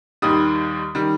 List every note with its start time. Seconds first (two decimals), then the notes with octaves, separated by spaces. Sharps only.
0.22 D#2 D#3 G3 D#6
0.95 D#3 G3